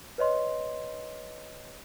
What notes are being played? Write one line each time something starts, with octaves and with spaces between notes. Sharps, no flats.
B4 C#5 D#5 C6